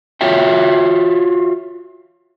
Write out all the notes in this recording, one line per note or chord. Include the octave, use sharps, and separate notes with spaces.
F4 F#4 C#5 E5 G5